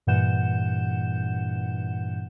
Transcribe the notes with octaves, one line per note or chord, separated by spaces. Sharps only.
G2 A#2 E3 F#5 G6 E7